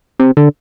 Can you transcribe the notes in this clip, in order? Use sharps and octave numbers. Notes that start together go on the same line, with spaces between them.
C3
D3